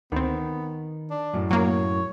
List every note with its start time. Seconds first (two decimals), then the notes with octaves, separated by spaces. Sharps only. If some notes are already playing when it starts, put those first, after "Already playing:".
0.12 D2 D#3 B3 C4
1.10 D4
1.33 F#2 A2
1.51 F#3 A#3 C#5